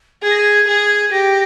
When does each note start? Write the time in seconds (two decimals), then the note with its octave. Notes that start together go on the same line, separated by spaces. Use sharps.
0.23 G#4 G#6
0.31 A#6
0.37 G#6
0.67 G#4
1.12 G4 A#6